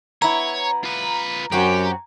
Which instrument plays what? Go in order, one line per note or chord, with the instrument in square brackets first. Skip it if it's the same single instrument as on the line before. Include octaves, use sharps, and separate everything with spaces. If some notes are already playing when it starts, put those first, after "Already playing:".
[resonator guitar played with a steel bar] B3 E4 [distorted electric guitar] C#5 [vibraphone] A#5
[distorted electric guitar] F4 B4
[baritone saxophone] F#2 [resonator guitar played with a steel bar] C4 C#4 F#4 [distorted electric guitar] G4